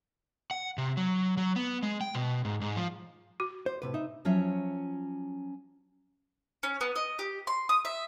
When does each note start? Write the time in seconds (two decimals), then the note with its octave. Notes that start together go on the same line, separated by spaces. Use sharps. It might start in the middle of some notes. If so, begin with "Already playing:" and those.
0.51 F#5
0.78 C3
0.97 F#3
1.37 F#3
1.56 B3
1.83 G#3
2.01 G5
2.15 B2
2.45 G#2
2.61 G#2
2.76 F3
3.40 F#4
3.66 C5
3.82 A2 C3 B4
3.94 D#4 E5
4.25 F3 F#3 C#4 F4 C#5 E5
6.63 C#4
6.81 B3
6.96 D#5
7.19 G4
7.47 C6
7.69 D#6
7.85 E5